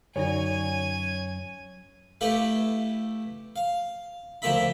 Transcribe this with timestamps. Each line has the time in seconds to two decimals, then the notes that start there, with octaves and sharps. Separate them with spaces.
0.16 F#2 D3 D#4 C#5 D5 G#5
2.21 A3 E4 G4 B4 F5
3.56 F5
4.42 D2 F3 A#3 F4 E5 B5